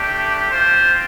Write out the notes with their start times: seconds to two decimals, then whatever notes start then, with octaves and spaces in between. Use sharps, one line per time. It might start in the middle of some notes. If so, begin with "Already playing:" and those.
Already playing: A3 D4 G4
0.52 C4 F4 C5